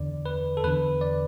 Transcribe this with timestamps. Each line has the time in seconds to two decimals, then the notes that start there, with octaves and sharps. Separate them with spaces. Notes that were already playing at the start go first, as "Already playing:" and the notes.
Already playing: E2 D3 D5
0.26 B4
0.57 A4
0.64 E2 D3 B4
1.01 D5